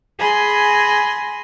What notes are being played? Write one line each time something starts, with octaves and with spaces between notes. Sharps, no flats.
G#4 G#5 B5 C6 A#6